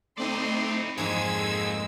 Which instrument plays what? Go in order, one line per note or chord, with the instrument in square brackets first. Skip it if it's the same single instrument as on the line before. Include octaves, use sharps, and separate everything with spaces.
[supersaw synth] A3 C4 D#4 [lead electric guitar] E4 D5 [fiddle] C6
[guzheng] F2 G#2 [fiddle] G#3 E6 [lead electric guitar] A#3 G#4 [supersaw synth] G#6